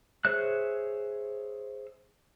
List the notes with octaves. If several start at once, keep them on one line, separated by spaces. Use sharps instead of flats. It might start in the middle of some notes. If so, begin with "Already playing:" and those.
G#4 C5 C#5 E5 F#6